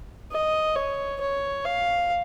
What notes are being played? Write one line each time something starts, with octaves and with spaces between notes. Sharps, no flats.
D#5
C#5
C#5
F5